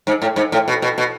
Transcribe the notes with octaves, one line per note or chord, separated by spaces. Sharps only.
G#2
A2
G#2
A2
B2
B2
B2